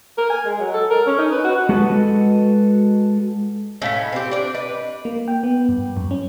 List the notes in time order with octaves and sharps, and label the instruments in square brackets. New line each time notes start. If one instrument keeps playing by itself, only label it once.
[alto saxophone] A#4
G#5
G#3
F#3
A4
A#4
C#4
D#4
B4
F#4
[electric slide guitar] G#3 F#4 A4 B4 D#5
[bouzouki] A2 C#4 [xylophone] D#5 F5 B6
[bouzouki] C4 G4
D4 D5
[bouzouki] B4 [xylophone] D#5
[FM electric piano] A#3
G5
B3
G2
F#2
C#4